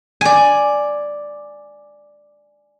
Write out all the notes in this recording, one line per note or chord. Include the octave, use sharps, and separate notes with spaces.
D5 G#5